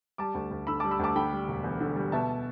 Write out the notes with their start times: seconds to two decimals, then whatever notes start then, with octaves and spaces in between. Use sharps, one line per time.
0.18 G3 A5 D6
0.34 D2
0.51 D2
0.67 D3 B5 E6
0.80 A5 D6
0.84 G3
0.91 B5 E6
0.99 D2 A5 D6
1.15 D3 G5 B5
1.33 G3
1.48 E1
1.64 E2
1.81 D3
1.96 G3
2.12 B2 E5 A5